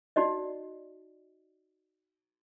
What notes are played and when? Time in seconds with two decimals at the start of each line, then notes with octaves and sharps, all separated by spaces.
0.16 D#4 F#4 D5 D#5